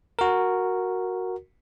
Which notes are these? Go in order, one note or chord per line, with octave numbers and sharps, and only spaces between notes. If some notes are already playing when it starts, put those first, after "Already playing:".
F#4 A#4